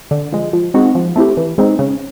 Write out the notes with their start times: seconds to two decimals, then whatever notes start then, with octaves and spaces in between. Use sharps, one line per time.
0.11 D3
0.32 F3 G#3
0.53 F3
0.74 G#3 C4 D#4 F#4
0.95 F3
1.16 A3 C4 E4 G4
1.37 E3
1.58 G#3 C4 D#4
1.79 C#3